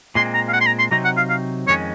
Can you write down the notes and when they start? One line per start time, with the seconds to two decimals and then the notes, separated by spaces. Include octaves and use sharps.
0.15 A#2 G#3 C4 C6
0.34 A#5
0.49 F5
0.53 F#5
0.61 C6
0.66 A#5
0.79 C6
0.91 C3 F#3 C4 D#4 A#5
1.05 F#5
1.17 F5
1.30 F5
1.68 F2 D#3 G#3 C#4 C#5